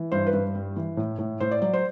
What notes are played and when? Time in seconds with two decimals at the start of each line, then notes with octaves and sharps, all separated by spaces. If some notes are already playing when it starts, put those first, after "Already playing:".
Already playing: E3
0.12 G2 C5
0.26 B4
0.33 G2
0.55 G3
0.76 E3
0.97 A2
1.19 A2
1.40 A2 C5
1.51 D5
1.62 F#3 D5
1.73 C5